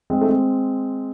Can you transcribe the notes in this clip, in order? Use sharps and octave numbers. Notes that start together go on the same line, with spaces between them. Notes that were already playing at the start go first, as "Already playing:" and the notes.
G#3 C4
A3
G#3 C4